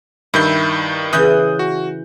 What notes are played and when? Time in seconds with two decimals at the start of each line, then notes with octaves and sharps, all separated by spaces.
0.34 G2 D#3 E4 G6
1.13 C#3 E3 D#6 F#6 G6
1.59 F#4